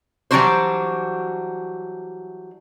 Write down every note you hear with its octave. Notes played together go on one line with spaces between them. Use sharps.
E3 F#3 G3 D4 F#4 C5